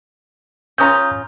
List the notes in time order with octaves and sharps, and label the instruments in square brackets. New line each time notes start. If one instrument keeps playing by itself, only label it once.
[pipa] C#3 C#4 F4 [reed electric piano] A#5 D#6 G6